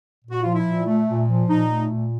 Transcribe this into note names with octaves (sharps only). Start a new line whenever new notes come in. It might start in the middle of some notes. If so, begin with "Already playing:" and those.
A#2
F#4
F3 F4
E4
A#2
A3
A#2
F3
A#2 D#4
A3
A#2